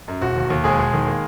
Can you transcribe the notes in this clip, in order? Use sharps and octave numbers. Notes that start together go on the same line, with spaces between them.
F#2
E1 F#4
D#2
D#2
E1 G#3 G#4
E1
D#3
A#3